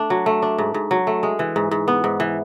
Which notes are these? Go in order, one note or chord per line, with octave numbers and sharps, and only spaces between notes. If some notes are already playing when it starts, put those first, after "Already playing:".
Already playing: A3 D4
F#3
A3
D4
G#2
G#2
F#3
A3
G#3
E3
G#2
G#2
B3
G#2
E3